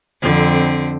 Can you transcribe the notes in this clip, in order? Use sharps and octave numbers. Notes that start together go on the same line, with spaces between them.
F2 D3 C4